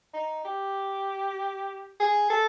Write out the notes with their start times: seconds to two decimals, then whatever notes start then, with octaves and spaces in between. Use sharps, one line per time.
0.14 D#4
0.45 G4
2.00 G#4
2.30 A4